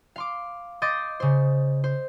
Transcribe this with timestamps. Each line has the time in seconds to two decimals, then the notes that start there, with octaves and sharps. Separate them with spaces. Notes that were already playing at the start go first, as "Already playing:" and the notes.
0.16 F5 C6 D6
0.82 D#5 C6 D6 G6 A6
1.20 C#3 C5
1.84 C5